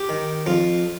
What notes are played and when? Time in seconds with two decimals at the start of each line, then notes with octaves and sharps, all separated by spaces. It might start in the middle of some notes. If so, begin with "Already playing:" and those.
Already playing: G4
0.09 D#3
0.46 F2 F4